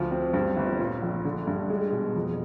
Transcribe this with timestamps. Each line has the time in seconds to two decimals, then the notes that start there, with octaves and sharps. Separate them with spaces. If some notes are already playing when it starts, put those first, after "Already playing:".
Already playing: D2 F3
0.11 C4
0.33 G2
0.57 G1
0.79 A#2
1.02 A#1
1.25 D3
1.47 G2
1.70 G#3
1.92 B2
2.15 F2